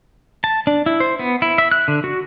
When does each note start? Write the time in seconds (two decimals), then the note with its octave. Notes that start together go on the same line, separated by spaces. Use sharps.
0.44 A5
0.67 D4
0.86 E4
1.00 C5
1.19 B3
1.42 E4
1.58 E5
1.72 F#6
1.88 D3
2.04 F#4